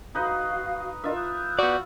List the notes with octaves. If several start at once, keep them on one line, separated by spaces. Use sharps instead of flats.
D#4 F#4 B4 D#5 F5 D#6
D4 F4 A#4 D#5 E5
D#6 F#6 G6
B3 F#4 D5